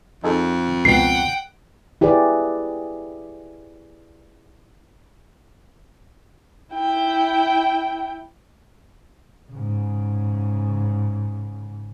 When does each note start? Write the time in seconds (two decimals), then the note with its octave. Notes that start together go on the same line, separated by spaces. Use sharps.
0.24 F2 D#4 G#4 A4
0.85 C#2 B2 F#5 G5 C7
2.01 E4 G4 G#4 B4 D5
6.74 E4 G5
9.51 G#2 C#3